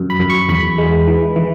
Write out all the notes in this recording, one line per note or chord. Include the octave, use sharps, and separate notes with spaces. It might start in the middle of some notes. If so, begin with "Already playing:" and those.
Already playing: F#2
B5
F#2
C#6
E2 B5
G#3
E3
E3